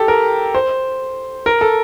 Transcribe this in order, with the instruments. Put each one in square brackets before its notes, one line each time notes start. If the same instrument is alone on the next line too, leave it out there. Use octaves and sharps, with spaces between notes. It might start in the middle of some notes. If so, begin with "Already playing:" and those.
Already playing: [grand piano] G4 A4
A#4
C5
A#4
A4